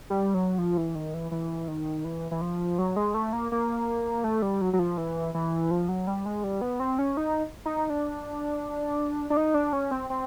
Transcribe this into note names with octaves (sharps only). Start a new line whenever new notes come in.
G3
F#3
F3
E3
D#3
E3
E3
D#3
E3
E3
F3
F#3
G#3
A3
A#3
A#3
A3
G3
F#3
F#3
F3
E3
E3
F3
F#3
G3
G#3
G3
B3
C4
C#4
D#4
D#4
D4
D4
D#4
D4
C#4
C4
C4